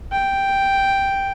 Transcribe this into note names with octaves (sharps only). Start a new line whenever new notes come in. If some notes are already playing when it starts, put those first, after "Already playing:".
G5